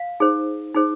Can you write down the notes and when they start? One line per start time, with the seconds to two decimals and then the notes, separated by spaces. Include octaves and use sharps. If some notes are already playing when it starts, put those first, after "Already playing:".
Already playing: F5
0.20 D#4 G#4 C5
0.75 D#4 G#4 C5